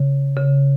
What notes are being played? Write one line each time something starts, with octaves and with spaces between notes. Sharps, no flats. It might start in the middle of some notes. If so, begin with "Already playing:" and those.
Already playing: C#3
C#3